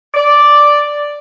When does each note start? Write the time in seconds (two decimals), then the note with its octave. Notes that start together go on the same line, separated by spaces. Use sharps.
0.14 D5